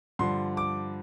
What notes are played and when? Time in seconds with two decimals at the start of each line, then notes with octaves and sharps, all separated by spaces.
0.19 G2 D3 F3 C6
0.57 D6